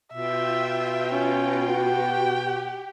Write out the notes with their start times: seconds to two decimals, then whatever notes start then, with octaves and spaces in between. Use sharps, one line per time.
0.14 B2 F4 E5 G5
1.11 C#4
1.71 F#4 G4 G5